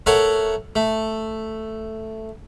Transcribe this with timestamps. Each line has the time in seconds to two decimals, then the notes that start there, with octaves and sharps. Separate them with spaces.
0.06 A3 A#4 C#5 F#5
0.76 A3